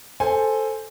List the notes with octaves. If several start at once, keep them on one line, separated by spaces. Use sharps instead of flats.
A4 C5 G#5